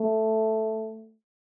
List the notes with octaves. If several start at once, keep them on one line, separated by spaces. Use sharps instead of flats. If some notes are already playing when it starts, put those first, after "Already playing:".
Already playing: A3